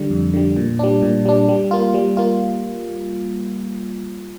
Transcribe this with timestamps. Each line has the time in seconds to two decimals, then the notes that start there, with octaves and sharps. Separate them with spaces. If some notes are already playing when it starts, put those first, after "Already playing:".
Already playing: D3 G3
0.11 F2
0.34 D3 G3
0.56 A#2
0.79 G3 D4
1.02 A#2
1.25 G3 D4
1.48 G3
1.71 A#3 F4
1.94 G3
2.17 A#3 F4